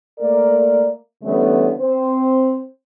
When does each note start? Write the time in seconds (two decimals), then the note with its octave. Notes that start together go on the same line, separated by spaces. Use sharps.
0.19 A3 A#3 A#4 D5
1.23 D3 E3 G3 A3 B3 C#4
1.78 C4 C5